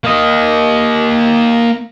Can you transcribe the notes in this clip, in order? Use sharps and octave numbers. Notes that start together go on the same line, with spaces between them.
A#3 D#5